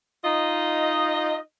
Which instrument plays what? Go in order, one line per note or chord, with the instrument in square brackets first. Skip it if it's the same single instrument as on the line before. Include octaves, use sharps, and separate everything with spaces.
[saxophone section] D#4 F4 D#5